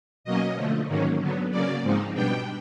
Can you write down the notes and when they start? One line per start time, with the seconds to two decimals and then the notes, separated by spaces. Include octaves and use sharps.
0.24 B2 F#3 A#3 C#4 D#5
0.56 D3 F3 A3
0.88 G#2 D#3 F#3 A#3 C#4
1.20 D3 F#3 B3
1.51 C#3 F#3 A#3 C#4 D5
1.83 G#2 F3 G#3 C4 D#4
2.14 B2 G3 B3 D4 G5